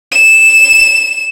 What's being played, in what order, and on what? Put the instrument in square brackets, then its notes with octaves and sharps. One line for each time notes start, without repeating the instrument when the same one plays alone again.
[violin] E7